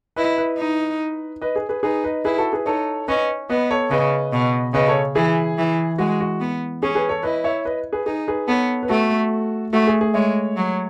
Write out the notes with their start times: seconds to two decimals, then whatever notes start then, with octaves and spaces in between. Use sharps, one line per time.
0.16 E4 B4 D#5
0.37 B4 D#5
0.58 D#4
1.42 B4 D#5
1.56 G#4
1.69 G#4 B4
1.83 D#4 G#4 B4
2.04 B4 D#5
2.25 E4 G#4 B4
2.38 F#4 A4
2.53 G#4 B4
2.66 D#4 A4 C#5
3.08 C#4 B4 D#5
3.50 B3 B4 D#5
3.71 A4 C#5
3.91 C#3 B4 D#5
4.32 B2
4.74 C#3 B4 D#5
4.88 A4 C#5
5.16 E3 G#4
5.58 E3
5.98 G#3 F#4
6.20 F#4
6.41 B3
6.83 C#4 G#4
6.95 G#4 B4
7.09 A4 C#5
7.23 E4 B4 D#5
7.44 C#5 E5
7.65 B4 D#5
7.93 G#4 B4
8.06 D#4 G#4
8.27 G#4 B4
8.48 B3 A4 C#5
8.83 B4
8.89 A3 F#4 A4
9.73 A3 F#4 A4
9.87 G#4
10.01 G#4
10.14 G#3 C#5 E5
10.57 F#3